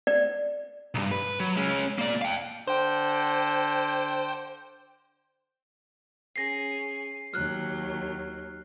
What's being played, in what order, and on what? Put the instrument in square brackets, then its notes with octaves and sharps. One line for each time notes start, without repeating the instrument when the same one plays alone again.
[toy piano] D5
[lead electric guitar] B1 G2
B4
F#3
G#3 C#4
A#3 D5
F5 G5
[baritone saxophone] D3 [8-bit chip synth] C5 G5
[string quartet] C#4 G#4 [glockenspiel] A#6 C7
[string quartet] D#2 F#3 [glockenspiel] F6 F#6